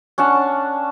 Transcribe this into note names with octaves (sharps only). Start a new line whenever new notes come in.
C#4 D4 F#5 A5